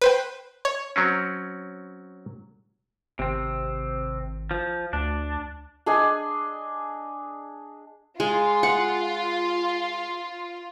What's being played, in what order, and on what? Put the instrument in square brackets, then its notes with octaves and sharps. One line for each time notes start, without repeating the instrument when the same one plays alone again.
[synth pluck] B4 C5 G5
C#5
[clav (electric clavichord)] F#3 C4 C#4
[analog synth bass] G#1 [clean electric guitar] C3 C4
[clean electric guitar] F3
[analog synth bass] D2 [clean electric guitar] D4
[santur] D4 G#4 D#5 G#5
[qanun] G#3 [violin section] F4
[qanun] F#5